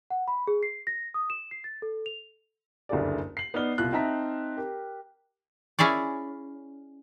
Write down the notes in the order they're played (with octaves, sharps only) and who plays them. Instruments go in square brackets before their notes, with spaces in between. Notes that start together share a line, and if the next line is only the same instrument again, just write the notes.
[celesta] F#5
B5
G#4
C7
A#6
D#6
E7
C7
A6
A4
F7
[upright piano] F#1 D2 G2 A3 G#4 D5
C7 F#7
B3 D#4 D5 F6 G7
C2 B2 E4 F4 F#6
C4 D#4 E5 A5 A#5 B6
G4 A#4
[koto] C#4 E4 G#4 C#5 D5